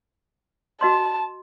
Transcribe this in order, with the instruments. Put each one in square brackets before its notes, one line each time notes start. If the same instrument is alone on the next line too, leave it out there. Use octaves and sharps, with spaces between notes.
[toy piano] F#4 D#5 C6 [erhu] A5